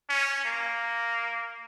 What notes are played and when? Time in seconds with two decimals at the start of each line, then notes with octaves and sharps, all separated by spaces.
0.09 C#4
0.45 A#3